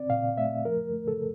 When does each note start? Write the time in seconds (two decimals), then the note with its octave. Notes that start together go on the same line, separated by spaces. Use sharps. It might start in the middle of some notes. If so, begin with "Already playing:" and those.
Already playing: C4 D5
0.10 A#2 F5
0.38 A3 E5
0.65 F3 A#4
0.93 A3
1.08 A4